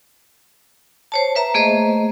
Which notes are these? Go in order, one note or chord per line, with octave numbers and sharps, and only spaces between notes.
C5 C#5 A5
B4 E5 A#5
A3 A#3 G#4 C5 D#5